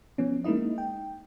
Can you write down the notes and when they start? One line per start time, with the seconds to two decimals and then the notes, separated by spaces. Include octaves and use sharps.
0.18 F3 B3 C#4
0.44 G#3 A#3 D#4 E4 D#5
0.78 G5